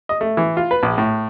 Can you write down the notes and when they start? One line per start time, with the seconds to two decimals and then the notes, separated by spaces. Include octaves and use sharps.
0.09 D#5
0.21 A3
0.37 E3
0.57 F4
0.71 B4
0.83 A#1
0.98 A2